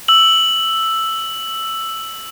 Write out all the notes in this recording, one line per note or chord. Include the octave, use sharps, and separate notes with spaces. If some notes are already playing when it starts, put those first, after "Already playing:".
E6 F#7